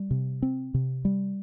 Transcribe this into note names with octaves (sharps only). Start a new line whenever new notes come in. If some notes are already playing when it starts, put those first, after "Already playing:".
Already playing: G3
C3
C4
C3
G3